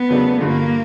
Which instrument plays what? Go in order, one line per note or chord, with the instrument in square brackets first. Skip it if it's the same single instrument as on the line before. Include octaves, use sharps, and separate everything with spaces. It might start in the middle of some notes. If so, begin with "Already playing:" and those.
Already playing: [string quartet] B3
[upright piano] E2 C#3 F#3 A3 D4
[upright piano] G2 D3 F3 [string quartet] A#3